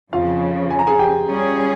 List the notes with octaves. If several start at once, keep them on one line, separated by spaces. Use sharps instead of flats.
F2 C#3 F3 F4 F5
G#5
A#5
G#4 G#5
G4 G5
G3 C#4 G#4